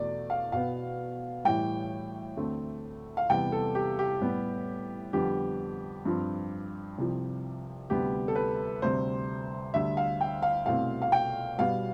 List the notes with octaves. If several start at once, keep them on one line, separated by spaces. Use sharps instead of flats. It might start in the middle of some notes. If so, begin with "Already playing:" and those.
Already playing: E2 B2 A3 D5
F5
B2 B3 F5
A2 E3 G3 G5
D2 D3 A3 C4
F5
E2 C3 G3 B3 G5
A4
G4
G4
A2 G3 B3
F2 D3 G3 B3 G4
G2 F3 C4
C2 C3 F3
D2 C3 G3 B3 G4
A4
B4
D2 C3 G3 C4 C5
D2 D3 G3 E5
F5
G5
F5
C2 B2 A3 C4 F5
F5
G5
B2 G3 B3 F5